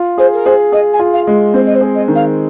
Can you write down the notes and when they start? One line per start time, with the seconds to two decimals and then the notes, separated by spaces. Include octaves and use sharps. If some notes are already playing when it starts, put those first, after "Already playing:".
Already playing: F4
0.18 G#4 C5
0.33 A#4
0.45 G#4 C5
0.72 G#4 D#5
0.93 G#5
0.99 F4
1.13 F5
1.27 G#3
1.54 C4 C5
1.66 D#5
1.75 C5
1.81 G#4
1.95 D#5
2.08 D#3
2.15 F5